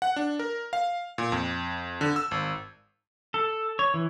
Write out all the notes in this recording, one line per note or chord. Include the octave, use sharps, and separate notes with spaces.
F#5
D4
A#4
F5
A#2
F2
D3
E6
G#1
A4
C#5
E3